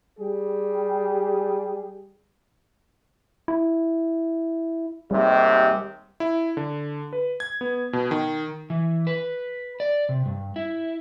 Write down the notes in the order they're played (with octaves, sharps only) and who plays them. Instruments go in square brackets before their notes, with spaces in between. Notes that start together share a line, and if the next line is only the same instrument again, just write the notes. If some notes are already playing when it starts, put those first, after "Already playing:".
[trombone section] G3 G4 G#4
[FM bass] E4
[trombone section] D#2 G#2 C3 [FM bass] G3
[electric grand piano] E4
D3
B4
G#6
B3
B2
D#3
[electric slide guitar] E3
B4
D5
C3
G2
E4